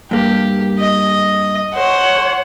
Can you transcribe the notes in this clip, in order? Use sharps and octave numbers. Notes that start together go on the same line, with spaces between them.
G2 A#3 G4
D#5
C5 C#5 F#5